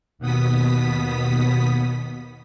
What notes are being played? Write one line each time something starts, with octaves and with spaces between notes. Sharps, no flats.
D#2 B2 B3 D#6 B6